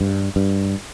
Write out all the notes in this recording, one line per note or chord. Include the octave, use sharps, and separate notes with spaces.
G2
G2